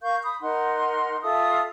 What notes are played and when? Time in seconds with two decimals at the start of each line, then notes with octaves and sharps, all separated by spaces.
0.02 A#4 F5 C#6 G6
0.23 B5 D#6
0.41 D#4 A#4 F#5 C6
1.23 F4 A4 E5 D#6